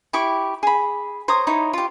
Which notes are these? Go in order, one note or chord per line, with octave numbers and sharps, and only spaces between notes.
E4 G4 C#6 D6
G#4 B5
C5 C#5 A#5 D#6
D#4 E4 C#5
F4 G4